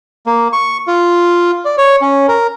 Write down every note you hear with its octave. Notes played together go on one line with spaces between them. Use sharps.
A#3
C#6
F4
D5
C#5
C#4
A#4